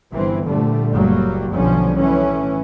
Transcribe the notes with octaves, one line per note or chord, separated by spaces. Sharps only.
G1 G2 E3 C4
A#2 D3 G3 A3
F#1 F#3 G3 A#3
B1 B2 D3 F3 G3 C#4
A2 E3 C#4